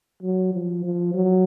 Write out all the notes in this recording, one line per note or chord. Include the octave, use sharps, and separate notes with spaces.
F#3
F3
F3
F#3